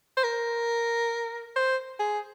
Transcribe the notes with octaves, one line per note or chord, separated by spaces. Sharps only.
C5
A#4
C5
G#4